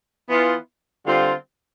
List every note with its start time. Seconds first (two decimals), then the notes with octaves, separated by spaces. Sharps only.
0.28 E3 B3 F4
1.06 D3 G3 C4 F4